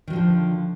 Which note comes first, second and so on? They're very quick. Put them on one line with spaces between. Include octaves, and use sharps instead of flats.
D#3 F#3 F3 D3